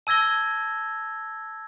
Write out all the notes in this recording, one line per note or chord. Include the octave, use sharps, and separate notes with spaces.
A5 E6 G#6 A#6 G7